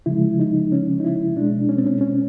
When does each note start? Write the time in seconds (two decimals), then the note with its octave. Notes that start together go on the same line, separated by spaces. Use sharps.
0.06 C#3 F3 G#3 E4
0.40 D#4
0.72 C#4
1.00 D#4
1.04 E4
1.36 B2 G#3 D4
1.69 C#4
1.77 C4
1.86 C#4
2.01 C#4